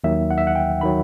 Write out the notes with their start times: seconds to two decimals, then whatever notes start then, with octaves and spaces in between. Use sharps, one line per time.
0.04 D#2 D#3 F#3 E5
0.31 F#5
0.38 E5
0.47 F#5
0.55 G5
0.81 D#3 F#3 B5